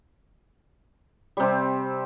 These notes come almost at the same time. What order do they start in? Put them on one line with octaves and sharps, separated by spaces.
G3 C3 C4